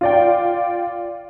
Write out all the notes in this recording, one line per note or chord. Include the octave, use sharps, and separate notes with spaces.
F4 D5 G5